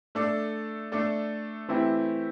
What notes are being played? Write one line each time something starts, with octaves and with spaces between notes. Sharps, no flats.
A3 D4 A4 D5
A3 D4 A4 D5
E3 A3 C4 E4 G4